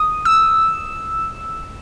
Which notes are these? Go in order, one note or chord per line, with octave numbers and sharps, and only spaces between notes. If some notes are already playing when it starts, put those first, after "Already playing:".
Already playing: D#6
E6